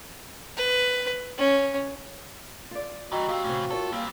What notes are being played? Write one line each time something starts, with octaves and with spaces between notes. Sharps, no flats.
B4
C#4
F4 D5
G2 E3 F#4 D#5 G5 A#5
F#2 C4 G4 F5 G5
A2 C3 E3 C#4
F4 A4 A#4 C#5
G3 A#3 C4 G4 F#5 G#5